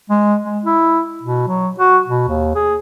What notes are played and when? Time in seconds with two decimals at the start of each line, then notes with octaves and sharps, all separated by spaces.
0.10 G#3
0.43 G#3
0.65 E4
1.23 B2
1.48 F#3
1.79 F#4
2.07 B2
2.28 D#2
2.55 G#4